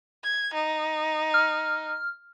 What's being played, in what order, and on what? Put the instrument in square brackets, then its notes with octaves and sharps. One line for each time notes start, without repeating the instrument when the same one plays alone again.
[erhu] G#6
D#4
[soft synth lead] F6